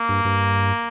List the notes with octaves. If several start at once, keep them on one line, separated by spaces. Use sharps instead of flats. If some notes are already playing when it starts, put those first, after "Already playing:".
Already playing: A#3
G2
G2